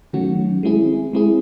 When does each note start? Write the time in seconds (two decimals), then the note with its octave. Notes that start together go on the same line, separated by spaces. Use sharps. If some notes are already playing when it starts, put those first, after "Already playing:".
0.13 D#3 F#3 A3 C#4 F#4
0.63 G#3 C4 E4 G#4
1.13 G#3 C4 E4 G#4